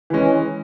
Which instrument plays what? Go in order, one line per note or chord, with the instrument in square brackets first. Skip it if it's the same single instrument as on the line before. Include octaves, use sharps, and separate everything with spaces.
[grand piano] E3 G#3 C#4